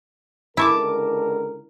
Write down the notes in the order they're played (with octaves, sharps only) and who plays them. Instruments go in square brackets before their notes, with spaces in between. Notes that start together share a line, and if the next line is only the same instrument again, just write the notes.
[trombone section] C#2 D3 A#4 [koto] E4 [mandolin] A5 C#6 D6